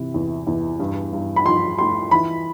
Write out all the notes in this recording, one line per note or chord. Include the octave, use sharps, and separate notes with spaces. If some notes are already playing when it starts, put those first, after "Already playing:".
Already playing: C3 E3
E2
E2
G2
G2
B5
F3 C6
A3 C6
E3 B5